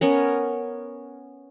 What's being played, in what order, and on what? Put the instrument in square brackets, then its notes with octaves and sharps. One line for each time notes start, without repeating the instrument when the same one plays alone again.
[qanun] B3 C#4 A#4